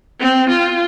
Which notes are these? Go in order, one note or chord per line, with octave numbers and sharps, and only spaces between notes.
C4
F4